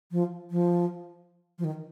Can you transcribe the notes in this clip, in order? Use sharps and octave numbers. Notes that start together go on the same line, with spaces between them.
F3
F3
F3
D#3